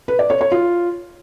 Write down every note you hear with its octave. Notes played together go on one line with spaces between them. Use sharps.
B4
D5
C#5
C#5
F4